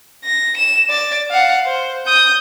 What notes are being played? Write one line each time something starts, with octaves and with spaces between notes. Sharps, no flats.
A#6
E7
D5 A6
F5 F#5
C5
D#6 G6